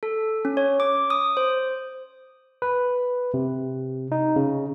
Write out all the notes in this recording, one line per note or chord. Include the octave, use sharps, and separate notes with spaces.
A4
C#4
C#5
D6
D#6
C5
B4
C3
D#4
C#3